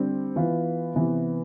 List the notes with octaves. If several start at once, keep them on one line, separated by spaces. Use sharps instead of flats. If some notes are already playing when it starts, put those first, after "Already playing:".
Already playing: D3 G3 C4 G4 C5
E3 B3 F4 B4
C3 E3 B3